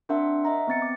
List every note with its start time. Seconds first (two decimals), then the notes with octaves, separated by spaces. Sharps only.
0.09 C4 D4 A#4 E5 F#5 C6
0.45 D#5 E5 F#5 A#5
0.67 B3 C4 A6 C#7
0.82 D6